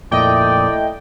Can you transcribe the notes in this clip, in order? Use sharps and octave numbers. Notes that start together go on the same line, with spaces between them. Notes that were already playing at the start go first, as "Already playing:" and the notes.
F2 A#2 A3 E4 D5 D#5 G5